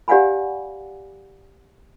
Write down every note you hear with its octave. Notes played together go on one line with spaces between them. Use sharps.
G4 D5 F5 F#5 G#5 B5